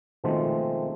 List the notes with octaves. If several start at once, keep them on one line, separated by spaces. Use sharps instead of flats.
B2 D#3 F3 G#3 A3 C4